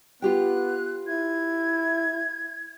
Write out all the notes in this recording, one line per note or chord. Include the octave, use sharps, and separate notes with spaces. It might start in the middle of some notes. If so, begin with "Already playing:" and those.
B3 F4 G4 G5 F#6
E4 G#6